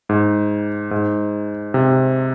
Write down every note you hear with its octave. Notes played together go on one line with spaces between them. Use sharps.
G#2
G#2
C3